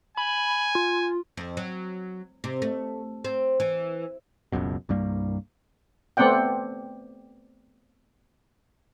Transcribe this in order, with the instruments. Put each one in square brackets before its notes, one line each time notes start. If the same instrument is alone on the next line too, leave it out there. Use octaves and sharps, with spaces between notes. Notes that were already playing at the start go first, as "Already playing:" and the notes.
[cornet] G#5 [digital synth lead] B5
[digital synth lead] F4
[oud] F2
F#3
C3
A3
C4
E3
[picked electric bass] F#1 C#2 F#2 B2
C2 G2 G3 A#3
[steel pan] A3 B3 C4 D5 F#5 G5